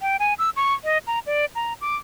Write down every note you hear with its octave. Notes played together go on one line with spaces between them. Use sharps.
G5
G#5
E6
C#6
D#5
A#5
D5
A#5
D6